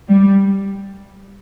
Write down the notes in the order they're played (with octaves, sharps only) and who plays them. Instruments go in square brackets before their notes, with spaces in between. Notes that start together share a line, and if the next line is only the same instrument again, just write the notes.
[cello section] G3